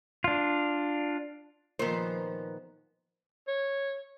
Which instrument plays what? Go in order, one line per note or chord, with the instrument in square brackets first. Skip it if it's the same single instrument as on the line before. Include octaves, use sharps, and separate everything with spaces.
[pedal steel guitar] D4 F4
[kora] A#2 D#3 [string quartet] F3 [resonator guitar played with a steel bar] B3 C5
[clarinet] C#5